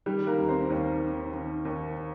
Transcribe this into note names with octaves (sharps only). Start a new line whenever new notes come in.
D#3 G3 G4
A#3 A#4
D#2
C4 C5
D#2 A#3 A#4
D#3
D#3
D#2